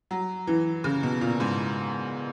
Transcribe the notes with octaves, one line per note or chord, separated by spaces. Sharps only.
F#3
E3
C#3
B2
A#2
G#2